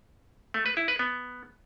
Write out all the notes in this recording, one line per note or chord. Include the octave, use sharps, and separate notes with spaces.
A3
B4
E4
B4
B3